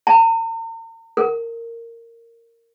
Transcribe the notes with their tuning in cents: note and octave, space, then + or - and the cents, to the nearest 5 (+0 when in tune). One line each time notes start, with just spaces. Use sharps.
A#5 -45
A#4 -15